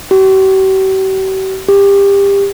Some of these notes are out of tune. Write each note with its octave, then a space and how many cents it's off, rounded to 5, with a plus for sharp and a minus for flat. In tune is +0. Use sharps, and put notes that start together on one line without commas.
G4 -45
G4 +25